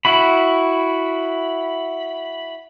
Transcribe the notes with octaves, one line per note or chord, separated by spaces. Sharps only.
E4 F#4 B5